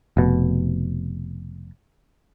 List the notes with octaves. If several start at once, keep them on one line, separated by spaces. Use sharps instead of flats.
F1 B2